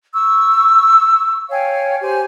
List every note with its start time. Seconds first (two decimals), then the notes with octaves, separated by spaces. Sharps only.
0.14 C#6 E6
1.50 C#5 F5 G5 G#5
2.01 G4 C5 G#5